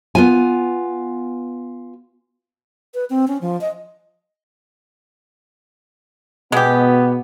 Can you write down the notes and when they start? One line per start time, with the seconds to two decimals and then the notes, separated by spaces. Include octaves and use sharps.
0.15 B3 F4 G#5
2.94 B4
3.10 C4
3.28 C#4
3.41 F3
3.61 D#5
6.52 B2 G#3 B3 G4